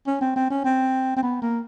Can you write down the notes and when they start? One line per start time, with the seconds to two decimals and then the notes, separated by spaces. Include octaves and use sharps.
0.07 C#4
0.21 C4
0.36 C4
0.50 C#4
0.65 C4
1.16 C4
1.23 B3
1.42 A#3